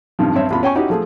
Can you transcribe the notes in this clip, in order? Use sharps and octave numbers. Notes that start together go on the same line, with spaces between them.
G2 C3 D#3 F3
G2 C4 C#5 E5
A1 E2 F4 B5
C#4 G5 G#5 C#6
C#4 D#4 E4 F#4 G4
F3 A3 G#4